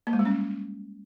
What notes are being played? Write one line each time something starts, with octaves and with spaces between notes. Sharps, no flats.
A#3
G#3
G3
C#4